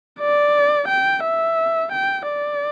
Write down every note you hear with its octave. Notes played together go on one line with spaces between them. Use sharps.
D5
G5
E5
G5
D5